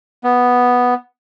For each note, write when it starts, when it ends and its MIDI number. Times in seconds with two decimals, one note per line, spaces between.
0.24 0.94 59